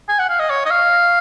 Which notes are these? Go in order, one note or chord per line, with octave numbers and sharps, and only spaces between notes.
G#5
F#5
F5
D#5
C#5
D#5
F5